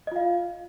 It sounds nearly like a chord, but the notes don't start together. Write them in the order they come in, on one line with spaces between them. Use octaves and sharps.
D#5 F4 F5